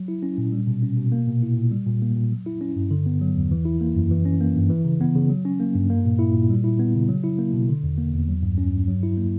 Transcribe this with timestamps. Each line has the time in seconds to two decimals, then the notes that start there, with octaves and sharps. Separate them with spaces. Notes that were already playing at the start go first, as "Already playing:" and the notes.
Already playing: F#3
0.08 E4
0.23 C#4
0.38 A#2
0.52 G3
0.67 B2
0.82 C#4
0.97 B2
1.12 A#3
1.28 A#2
1.43 E4
1.57 A#2
1.71 G3
1.87 A#2
2.02 A#3
2.17 A#2
2.32 F#3
2.46 E4
2.61 C#4
2.76 G2
2.91 D3
3.06 B3
3.21 F#3
3.36 E2
3.51 E3
3.65 E4
3.81 A#3
3.95 F#2
4.11 E3
4.26 C#4
4.41 A#3
4.56 G2
4.70 E3
4.85 C#3
5.01 B3
5.15 C#3
5.29 F#3
5.45 C#4
5.60 A#3
5.75 G2
5.90 A#3
6.05 A#2
6.19 E4
6.34 A#2
6.50 G3
6.64 E4
6.79 B3
6.95 C#3
7.09 F#3
7.24 E4
7.39 A#3
7.53 B2
7.69 D3
7.83 E2
7.98 A#3
8.13 E2
8.28 F#3
8.43 G2
8.58 C#4
8.73 G2
8.88 F#3
9.03 E4
9.18 A#3